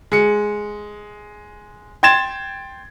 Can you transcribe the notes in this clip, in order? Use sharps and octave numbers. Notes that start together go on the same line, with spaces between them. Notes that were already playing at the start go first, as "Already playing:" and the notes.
G#3 C#7
G5 C6 G#6 A6 E7